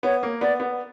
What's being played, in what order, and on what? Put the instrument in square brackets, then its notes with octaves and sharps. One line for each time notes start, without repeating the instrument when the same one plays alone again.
[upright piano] B3 [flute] C#5
[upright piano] A#3
[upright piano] B3 [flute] D5
[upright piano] B3